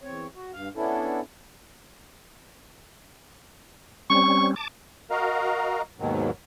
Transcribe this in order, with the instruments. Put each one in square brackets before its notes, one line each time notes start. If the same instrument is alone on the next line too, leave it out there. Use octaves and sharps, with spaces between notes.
[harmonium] E2 C4 C#5
F#4
G2 F5
B3 C#4 D4 E4 A4
[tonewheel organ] G3 C4 C#4 [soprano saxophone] C#6
[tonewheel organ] A5 D6
[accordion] F#4 A#4 D#5 F5 A#5
D#2 G#2 B2 D#3 F#3